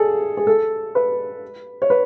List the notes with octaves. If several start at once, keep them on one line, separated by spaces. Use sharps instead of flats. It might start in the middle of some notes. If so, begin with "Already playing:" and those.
Already playing: G#4 A4
G#4
A4
B4
C#5
B4